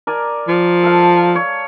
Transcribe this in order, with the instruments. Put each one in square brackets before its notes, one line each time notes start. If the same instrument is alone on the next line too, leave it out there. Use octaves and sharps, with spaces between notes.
[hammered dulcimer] A#4 D5 G#5
[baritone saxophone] F3
[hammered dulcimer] A4 F5
C#5